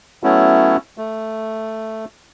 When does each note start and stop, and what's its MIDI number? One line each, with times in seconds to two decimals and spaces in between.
0.23 0.77 54
0.23 0.77 57
0.23 0.77 59
0.23 0.77 61
0.23 0.77 64
0.98 2.05 57